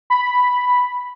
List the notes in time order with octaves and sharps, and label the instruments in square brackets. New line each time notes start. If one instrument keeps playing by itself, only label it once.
[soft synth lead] B5